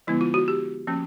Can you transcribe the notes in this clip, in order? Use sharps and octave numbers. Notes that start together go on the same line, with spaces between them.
D3 F3 G#3 B3 E4
F4
F#4
G4
F3 A#3 C#4